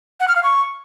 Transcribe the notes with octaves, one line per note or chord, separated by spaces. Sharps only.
F#5
F6
F5
C#6